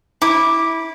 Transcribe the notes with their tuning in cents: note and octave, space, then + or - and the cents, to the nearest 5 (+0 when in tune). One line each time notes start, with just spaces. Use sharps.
E4 -15 D6 +5